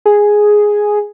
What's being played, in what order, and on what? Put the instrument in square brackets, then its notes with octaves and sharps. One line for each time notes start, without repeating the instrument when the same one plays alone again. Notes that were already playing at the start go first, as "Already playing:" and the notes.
[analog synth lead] G#4